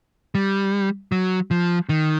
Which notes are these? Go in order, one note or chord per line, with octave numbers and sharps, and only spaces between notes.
G3
F#3
F3
D#3